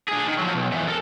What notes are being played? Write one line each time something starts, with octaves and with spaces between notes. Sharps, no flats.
D4 G#4
D#3
F3 F#3
B1
F2 E3
A4 A#4